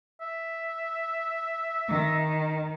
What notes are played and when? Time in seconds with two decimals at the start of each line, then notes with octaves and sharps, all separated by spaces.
0.21 E5
1.88 D#3